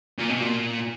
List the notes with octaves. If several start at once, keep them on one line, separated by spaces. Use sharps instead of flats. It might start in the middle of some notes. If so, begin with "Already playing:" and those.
A#2
B2
A#2